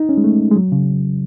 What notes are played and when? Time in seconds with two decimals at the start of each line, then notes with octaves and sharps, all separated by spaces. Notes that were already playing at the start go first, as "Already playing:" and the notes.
Already playing: D#4
0.09 C#4
0.17 G#3
0.24 A3
0.51 G#3
0.56 F#3
0.72 C#3